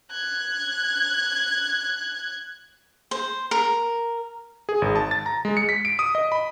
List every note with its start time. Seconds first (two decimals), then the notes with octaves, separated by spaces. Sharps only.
0.11 F#6 G#6
3.11 C5
3.51 A#4
4.69 G#4
4.82 G#1
4.96 A5
5.11 A6
5.26 A#5
5.45 G#3
5.57 C#7
5.69 B6
5.85 D7
5.99 D#6
6.15 D#5
6.32 B5